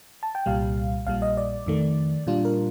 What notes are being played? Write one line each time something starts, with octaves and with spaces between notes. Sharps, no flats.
A5
G5
C2 A#2 G3 F5
A#1 A#2 G3 F5
D#5
D5
F2 D#3 A3
A#2 G3 D4 F4
A#4